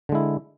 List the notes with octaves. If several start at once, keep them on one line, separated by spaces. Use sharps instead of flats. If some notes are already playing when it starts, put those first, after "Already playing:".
D3 G#3 E4